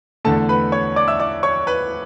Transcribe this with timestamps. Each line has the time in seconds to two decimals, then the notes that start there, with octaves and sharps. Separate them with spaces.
0.25 E2 D3 A3 A4 A5
0.49 B4 B5
0.72 C#5 C#6
0.96 D5 D6
1.08 E5 E6
1.20 D5 D6
1.43 C#5 C#6
1.67 B4 B5